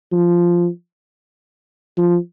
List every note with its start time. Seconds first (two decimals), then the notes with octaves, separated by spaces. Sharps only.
0.12 F3
1.98 F3